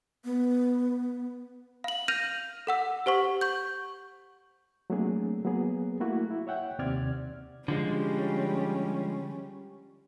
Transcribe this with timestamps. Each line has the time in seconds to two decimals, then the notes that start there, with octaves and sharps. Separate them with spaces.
0.25 B3
1.84 F5 F#7
2.08 F6 G6 A#6 D#7 F7
2.67 A4 F#5 E6
3.06 G4 C5 F#5 C#6
3.41 C#6 G6
4.90 F#3 A3 A#3 C4 D4 G#4
5.45 F#3 A#3 B3 G#4
6.00 A3 A#3 E4 F#4
6.30 E4
6.47 C#5 E5 F#5 G5
6.79 D#2 C3 C4 D5 F6 G#6
7.68 D3 F3 G3 G#3 C#4